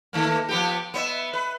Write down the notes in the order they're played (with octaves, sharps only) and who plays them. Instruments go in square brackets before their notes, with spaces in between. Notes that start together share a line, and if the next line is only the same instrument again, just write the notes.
[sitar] D#3 A3 A#3
F3 B3 G4
B3 C5 E5
B4